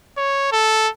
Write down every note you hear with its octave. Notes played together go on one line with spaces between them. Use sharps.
C#5
A4